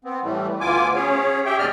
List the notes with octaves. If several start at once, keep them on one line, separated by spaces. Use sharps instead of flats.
B3 C4
A2 E3 G3 A3
D2 B3 F4 G#5 D6
C#4 G#4 C#5
G4 G#4 E5 G5
D#2 B2 G3 D5 D#5 F6